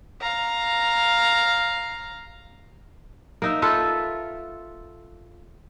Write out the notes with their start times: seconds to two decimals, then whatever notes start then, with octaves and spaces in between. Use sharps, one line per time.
0.21 F5 A#5
3.42 A#3 D#4 E5
3.62 F4 A4 B4 E5